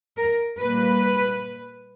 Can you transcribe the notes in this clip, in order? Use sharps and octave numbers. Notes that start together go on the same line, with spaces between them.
A#4
A#2 G3 A#3 B4